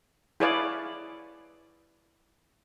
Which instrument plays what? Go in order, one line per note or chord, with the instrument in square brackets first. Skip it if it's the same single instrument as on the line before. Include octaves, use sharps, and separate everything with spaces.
[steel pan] E4 G#4 B4 C#5 D5 F5